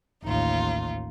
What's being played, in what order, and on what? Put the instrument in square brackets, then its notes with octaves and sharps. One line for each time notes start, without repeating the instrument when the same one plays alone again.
[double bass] A1 D#2 [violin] D#4 F4